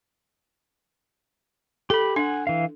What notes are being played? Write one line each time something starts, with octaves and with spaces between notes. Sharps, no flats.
G4 A4 B5
D4 F#5 G#5
E3 F5